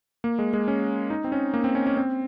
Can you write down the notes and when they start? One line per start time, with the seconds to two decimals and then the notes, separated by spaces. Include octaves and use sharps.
0.24 A#3
0.39 G#3
0.53 G#3
0.68 C#4
1.10 D#4
1.24 C4
1.32 C#4
1.54 A#3
1.64 C4
1.75 C#4
1.87 C#4
1.97 C4